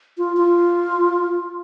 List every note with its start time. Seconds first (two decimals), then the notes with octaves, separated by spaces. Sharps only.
0.18 F4
0.37 F4